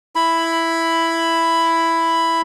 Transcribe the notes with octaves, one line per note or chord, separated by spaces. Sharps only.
E4 B5